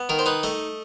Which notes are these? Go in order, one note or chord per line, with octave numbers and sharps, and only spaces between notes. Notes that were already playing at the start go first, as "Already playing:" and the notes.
Already playing: B3
D#3 A#4
C5
D#4 B4
A3 D#5